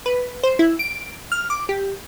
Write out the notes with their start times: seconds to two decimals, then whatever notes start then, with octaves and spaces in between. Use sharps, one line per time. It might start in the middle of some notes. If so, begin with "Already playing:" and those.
0.06 B4
0.43 C5
0.59 E4
0.79 D7
1.32 F6
1.50 D6
1.69 G4